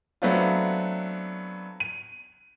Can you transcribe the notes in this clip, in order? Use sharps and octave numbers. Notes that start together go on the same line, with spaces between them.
F#3 A3 B3 C4 D4 F4
D#7